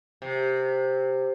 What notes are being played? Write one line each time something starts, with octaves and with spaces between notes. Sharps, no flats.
C3